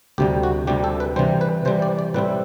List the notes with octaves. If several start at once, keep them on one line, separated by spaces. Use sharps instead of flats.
D2 C3 G3 G4
F#4
D2 C3 G3 G4
A4
B4
C3 E3 G3 C5
B4
C3 E3 G3 C5
D5
D5
A2 G3 C4 E4 B4